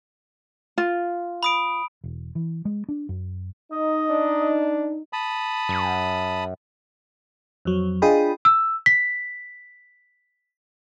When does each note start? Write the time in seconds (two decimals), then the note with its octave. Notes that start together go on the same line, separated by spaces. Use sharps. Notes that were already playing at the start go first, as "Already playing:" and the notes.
0.78 F4
1.43 B5 D#6 D7
2.04 E1
2.35 E3
2.65 G#3
2.89 D4
3.09 F#2
3.72 D#4 D#5
4.11 D4
5.13 A5 B5 D#6
5.69 F#2
7.65 F2 F#3
8.02 D4 F4 G#4 D#5 G5 B5
8.45 E6
8.86 B6